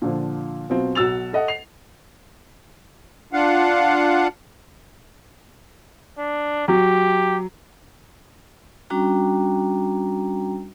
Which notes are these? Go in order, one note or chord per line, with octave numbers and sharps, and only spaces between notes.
A#2 D3 F3
B2 F#3 C4 F4
B1 F#4 E6 A6 F7
A4 D#5 F#5
C7 F7
D4 F4 F5 F#5
D4
F#3 G4
G3 C#4 D4 F#4 G5 A#5